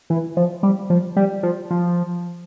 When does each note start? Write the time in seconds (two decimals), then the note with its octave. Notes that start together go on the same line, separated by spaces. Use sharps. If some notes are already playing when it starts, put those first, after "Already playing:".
0.10 E3
0.37 F3
0.63 G3
0.90 F3
1.16 G3
1.43 F3
1.70 F3